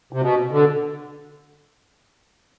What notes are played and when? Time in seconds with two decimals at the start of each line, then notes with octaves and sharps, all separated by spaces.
0.13 C3
0.22 B2
0.51 D3